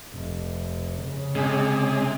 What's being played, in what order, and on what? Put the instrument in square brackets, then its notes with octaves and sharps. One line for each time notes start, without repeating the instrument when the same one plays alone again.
[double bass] F1
C#3
[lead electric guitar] C3 [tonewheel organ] G#3 C#4 G#4